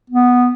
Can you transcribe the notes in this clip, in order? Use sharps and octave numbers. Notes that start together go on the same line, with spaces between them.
B3